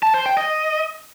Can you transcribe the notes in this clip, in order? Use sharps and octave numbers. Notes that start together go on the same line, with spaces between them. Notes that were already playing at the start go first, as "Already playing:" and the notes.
A5
C5
G5
D#5